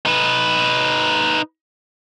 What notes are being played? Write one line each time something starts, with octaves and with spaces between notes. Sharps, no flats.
D#4 B4